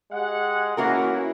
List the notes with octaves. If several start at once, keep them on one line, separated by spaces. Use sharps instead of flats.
G#3 G4 F#5
E3 A#3 C#4 E4 F#4 A#4